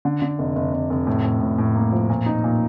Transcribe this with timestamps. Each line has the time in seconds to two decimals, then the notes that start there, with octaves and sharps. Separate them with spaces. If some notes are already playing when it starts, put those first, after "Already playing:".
0.05 D3
0.22 D3
0.39 F1
0.56 F1
0.73 F1
0.90 F1
1.07 A2
1.24 A2
1.41 A2
1.58 A2
1.75 A#3
1.92 F3
2.09 A#2
2.26 D#4
2.44 A#2